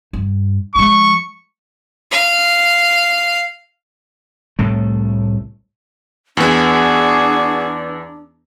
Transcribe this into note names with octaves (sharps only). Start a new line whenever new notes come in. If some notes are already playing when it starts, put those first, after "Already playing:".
G2
F3 G#3 C#6
F5
C2 A2 A3
E2 B3 D4 F#4 G#4